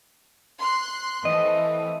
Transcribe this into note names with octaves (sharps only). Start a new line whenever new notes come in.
C6 F#6
E3 A3 C4 D#5